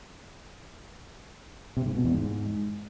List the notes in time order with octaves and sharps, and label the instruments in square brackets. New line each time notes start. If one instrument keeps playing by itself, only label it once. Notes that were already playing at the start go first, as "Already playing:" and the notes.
[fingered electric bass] C3
G#2
B2
E2
G#2